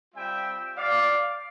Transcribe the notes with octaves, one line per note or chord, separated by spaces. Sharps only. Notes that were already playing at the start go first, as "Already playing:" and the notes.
G3 C4 F4 E5 G5
D5 F5